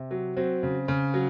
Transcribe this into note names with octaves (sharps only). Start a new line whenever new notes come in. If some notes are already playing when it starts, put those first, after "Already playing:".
Already playing: C3
F#3
F#3 C4
C#3
C#3
F#3